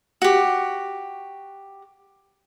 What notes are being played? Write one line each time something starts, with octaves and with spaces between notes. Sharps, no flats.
F#4 G4